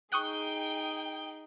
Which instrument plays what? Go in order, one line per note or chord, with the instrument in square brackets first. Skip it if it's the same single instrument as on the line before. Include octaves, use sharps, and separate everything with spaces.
[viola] D#4 G#4 [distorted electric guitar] G5 [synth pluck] C#6 D#6 F#6 [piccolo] G7